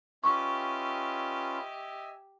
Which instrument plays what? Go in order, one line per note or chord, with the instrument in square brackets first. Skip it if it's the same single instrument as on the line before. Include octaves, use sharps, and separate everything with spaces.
[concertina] C#4 F4 B4 [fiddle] G4 [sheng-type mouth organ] D#5 E5 G#5 [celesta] C#6